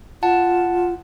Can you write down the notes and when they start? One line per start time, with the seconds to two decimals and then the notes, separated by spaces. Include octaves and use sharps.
0.23 F4 F#5 A5